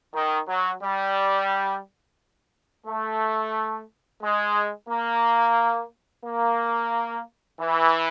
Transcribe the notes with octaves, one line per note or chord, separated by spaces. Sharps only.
D#3
F#3
G3
A3
G#3
A#3
A#3
E3